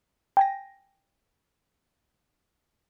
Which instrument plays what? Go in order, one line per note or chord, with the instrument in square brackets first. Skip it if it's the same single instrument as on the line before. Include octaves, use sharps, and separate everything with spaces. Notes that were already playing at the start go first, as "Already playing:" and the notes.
[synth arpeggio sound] G5 G#5 A#6